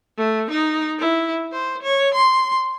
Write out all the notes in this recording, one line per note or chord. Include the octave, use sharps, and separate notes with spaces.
A3
D#4
E4
C5
C#5
C6